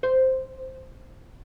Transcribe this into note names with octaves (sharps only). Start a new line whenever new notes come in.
C5